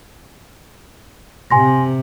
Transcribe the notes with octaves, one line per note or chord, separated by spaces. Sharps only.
C3 G#5 C6 A#6